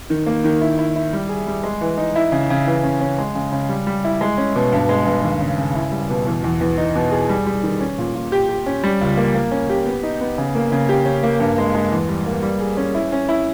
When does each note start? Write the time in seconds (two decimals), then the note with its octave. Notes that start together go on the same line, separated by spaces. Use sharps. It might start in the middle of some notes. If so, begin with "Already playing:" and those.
0.10 D#3
0.26 A#3
0.44 D#3
0.61 E4
0.79 E4
0.96 E4
1.13 G3
1.29 G#4
1.47 G3
1.63 G#3
1.81 E3
1.98 D#4
2.16 E4
2.32 C#3
2.50 C#3
2.67 E3
2.83 C#4
3.01 C#4
3.18 G#3
3.35 C#3
3.52 C#3
3.69 G3
3.87 G3
4.04 E4
4.21 G#3
4.38 C#4
4.56 B2
4.72 G2
4.89 G#3
5.06 G2
5.24 D#2
5.40 C#3
5.58 C#3
5.75 E4
5.92 G3
6.10 B2
6.26 E2
6.44 E2
6.61 E2
6.78 D#4
6.95 B2
7.12 G#4
7.29 G3
7.46 G3
7.63 D#3
7.81 C#4
7.98 A#2
8.15 A#2
8.32 G4
8.49 G4
8.66 C#4
8.83 G3
9.01 C#2
9.17 A#3
9.35 A#3
9.51 C#4
9.70 G4
9.86 B3
10.03 D#4
10.21 B3
10.38 C#3
10.55 A#3
10.72 C#3
10.89 G4
11.05 C#4
11.23 A#3
11.40 G2
11.58 G#3
11.74 G#3
11.92 E2
12.09 G3
12.26 A#3
12.43 G3
12.60 G#4
12.77 C#4
12.95 E4
13.12 C#4
13.29 E4